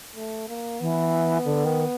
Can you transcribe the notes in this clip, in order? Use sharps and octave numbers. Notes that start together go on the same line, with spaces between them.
A3
A#3
E3 B3
D3
D#3